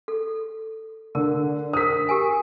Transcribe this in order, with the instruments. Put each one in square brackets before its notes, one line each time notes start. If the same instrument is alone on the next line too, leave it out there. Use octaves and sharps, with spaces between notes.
[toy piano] A4
[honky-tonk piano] D3 [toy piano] A#4
[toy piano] A#4 C5 [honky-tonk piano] D#6 B6
[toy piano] G4 A#4 G#5